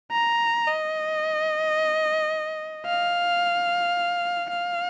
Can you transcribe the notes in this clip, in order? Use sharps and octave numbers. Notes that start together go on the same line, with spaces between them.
A#5
D#5
F5
F5